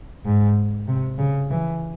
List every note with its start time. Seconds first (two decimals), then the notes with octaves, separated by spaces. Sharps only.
0.25 G#2
0.88 C3
1.18 C#3
1.50 E3